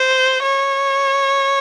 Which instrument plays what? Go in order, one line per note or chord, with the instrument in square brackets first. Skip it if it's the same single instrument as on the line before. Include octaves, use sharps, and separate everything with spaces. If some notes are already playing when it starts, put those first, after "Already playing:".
Already playing: [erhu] C5
C#5